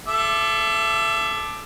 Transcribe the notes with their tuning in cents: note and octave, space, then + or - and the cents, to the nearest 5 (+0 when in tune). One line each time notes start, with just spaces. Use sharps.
A4 -20 E5 +30 D6 +15